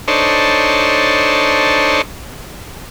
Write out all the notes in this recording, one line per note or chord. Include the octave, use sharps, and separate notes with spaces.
D4 D#4 A4 C5 C#5